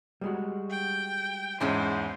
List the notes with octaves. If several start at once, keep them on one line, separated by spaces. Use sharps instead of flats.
G3 G#3 F#4
G5
E2 G#2 G#3 C#4 E4 C5